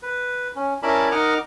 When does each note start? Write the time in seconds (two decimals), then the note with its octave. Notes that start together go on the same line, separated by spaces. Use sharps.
0.03 B4
0.56 C#4
0.83 C#4 E4 A#4 D5 A5 B5
1.12 D#4 A#4 D#5 F#5 D6 F6